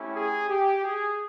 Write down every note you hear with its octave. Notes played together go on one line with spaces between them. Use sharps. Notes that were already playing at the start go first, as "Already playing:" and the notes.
Already playing: A3 C#4 E4 G4
G#4
G4
G#4